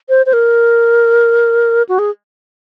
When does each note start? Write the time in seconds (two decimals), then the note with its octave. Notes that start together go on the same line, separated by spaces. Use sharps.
0.09 C5
0.26 C5
0.33 A#4
1.89 F#4
1.99 G#4